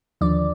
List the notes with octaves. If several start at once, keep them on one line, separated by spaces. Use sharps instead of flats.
D#2 D3 F3 D5